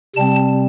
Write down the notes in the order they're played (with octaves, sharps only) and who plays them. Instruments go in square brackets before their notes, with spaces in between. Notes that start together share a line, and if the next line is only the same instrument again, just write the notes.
[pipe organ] C3 G3 C4 A5